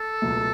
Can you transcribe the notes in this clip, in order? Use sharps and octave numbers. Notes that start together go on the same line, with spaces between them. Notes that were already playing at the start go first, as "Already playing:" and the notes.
Already playing: A4
C#2 B2 F#3 A3